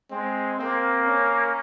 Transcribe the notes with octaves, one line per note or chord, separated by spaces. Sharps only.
G#3 C4
A#3 C4
C#4